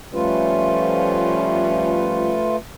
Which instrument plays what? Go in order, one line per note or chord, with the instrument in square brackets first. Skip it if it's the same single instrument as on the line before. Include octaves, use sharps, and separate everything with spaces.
[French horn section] F3 G3 C#4 [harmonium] A3 F4 B4